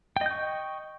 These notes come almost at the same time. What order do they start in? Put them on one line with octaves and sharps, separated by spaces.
G5 D#5 G6 C#6